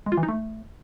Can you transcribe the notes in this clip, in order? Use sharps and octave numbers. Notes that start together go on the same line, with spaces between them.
G#3
F4
E3
D#4
A3